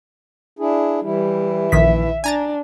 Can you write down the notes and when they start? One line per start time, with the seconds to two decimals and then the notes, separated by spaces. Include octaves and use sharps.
0.59 D4 E4 G#4
1.03 E3 G3 E4
1.72 A#1 D#3 E5 B6
2.24 D4 G#5 A#5 A6